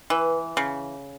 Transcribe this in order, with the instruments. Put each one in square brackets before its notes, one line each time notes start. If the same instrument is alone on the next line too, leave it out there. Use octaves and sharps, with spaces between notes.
[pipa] E3 [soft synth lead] B4
[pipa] C#3